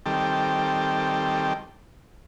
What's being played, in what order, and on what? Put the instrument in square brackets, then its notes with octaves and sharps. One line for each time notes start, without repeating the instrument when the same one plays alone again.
[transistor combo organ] D#3 G3 C4 G4 A4